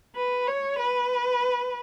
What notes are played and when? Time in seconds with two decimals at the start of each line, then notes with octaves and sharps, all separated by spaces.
0.16 B4
0.48 C#5
0.79 B4